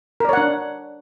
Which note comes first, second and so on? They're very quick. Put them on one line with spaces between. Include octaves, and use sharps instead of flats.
A#4 D5 C#5 F#5 D4